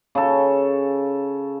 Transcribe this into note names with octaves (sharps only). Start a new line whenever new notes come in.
C#3 A4